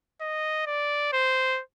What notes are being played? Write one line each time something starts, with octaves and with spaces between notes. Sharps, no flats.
D#5
D5
C5